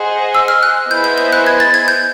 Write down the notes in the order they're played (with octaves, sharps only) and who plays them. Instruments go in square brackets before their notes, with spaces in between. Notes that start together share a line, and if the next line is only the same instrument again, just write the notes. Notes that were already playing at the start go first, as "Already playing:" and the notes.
Already playing: [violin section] G#4 C5 D#5 F#5
[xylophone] E6
F6
F#6
[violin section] B3 E4 G#4 C5 D#5 [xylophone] G6
[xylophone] G6
G6
F#6
G#6
A6
G#6
G6